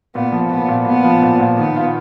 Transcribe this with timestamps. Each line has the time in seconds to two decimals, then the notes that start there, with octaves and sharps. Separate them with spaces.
0.15 A#2 B3
0.32 F3
0.51 A#2 B3
0.68 A#2
0.86 A#2 B3
1.04 F3
1.22 A#2
1.40 A#2
1.57 D#3 B3
1.76 F4